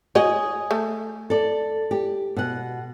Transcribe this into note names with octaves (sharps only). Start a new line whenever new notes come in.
F#4 G#4 C#5 D#5
A3
A4 D5
G4
B2 F#5